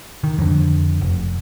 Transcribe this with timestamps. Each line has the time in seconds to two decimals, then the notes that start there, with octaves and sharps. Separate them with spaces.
0.24 D#3
0.38 F2 D3
1.01 F1